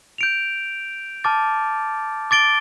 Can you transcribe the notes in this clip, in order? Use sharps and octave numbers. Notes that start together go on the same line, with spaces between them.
G6 D7 F7
A5 D6 F6 A6
D6 A6 D7 G7